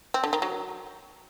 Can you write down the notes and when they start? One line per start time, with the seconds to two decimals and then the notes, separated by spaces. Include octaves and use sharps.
0.14 C4
0.24 D3
0.33 D#3
0.42 F#3